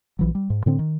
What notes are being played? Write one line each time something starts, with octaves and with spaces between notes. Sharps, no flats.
A#1 E3 F#3
G3
G#2
A2 D3 C4
D#3